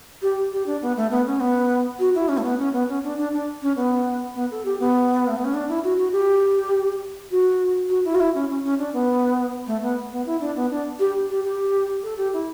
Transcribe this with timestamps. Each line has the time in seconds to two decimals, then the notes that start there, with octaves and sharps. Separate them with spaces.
0.22 G4
0.52 G4
0.66 D4
0.82 B3
0.96 A3
1.11 B3
1.26 C#4
1.40 B3
1.99 F#4
2.15 E4
2.28 C#4
2.37 A3
2.44 B3
2.59 C#4
2.73 B3
2.88 C#4
3.03 D4
3.18 D4
3.32 D4
3.62 C#4
3.76 B3
4.35 B3
4.51 A4
4.65 G4
4.80 B3
5.28 A3
5.36 B3
5.45 C#4
5.54 D4
5.69 E4
5.84 F#4
5.98 F#4
6.12 G4
7.31 F#4
7.90 F#4
8.05 E4
8.15 F#4
8.20 E4
8.35 C#4
8.49 C#4
8.64 C#4
8.79 D4
8.93 B3
9.67 A3
9.82 B3
10.11 B3
10.26 E4
10.41 D4
10.56 B3
10.70 D4
10.99 G4
11.30 G4
11.44 G4
12.03 A4
12.18 G4
12.33 E4